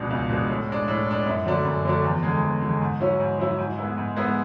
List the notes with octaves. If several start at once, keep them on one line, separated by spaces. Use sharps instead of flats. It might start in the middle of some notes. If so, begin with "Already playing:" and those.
Already playing: C#2 B2 G#3 D4
C#2
B2 G#3 D4
A2
G#3 D4
A2
G#3 D4
F#2
D3 F#3 A3 D4
F#2
D3 F#3 A3 D4
E2
D3 G#3
E2
D3 G#3
G#2
F#3 C#4 E4
G#2
F#3 C#4 E4
G#2
G#3 B3 E4
G#2
G#3 B3 E4